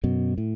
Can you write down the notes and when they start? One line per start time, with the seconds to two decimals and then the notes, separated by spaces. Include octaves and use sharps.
0.04 F#2 B2
0.38 A2